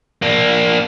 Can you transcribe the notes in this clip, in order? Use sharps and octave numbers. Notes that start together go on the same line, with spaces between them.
A#3 D4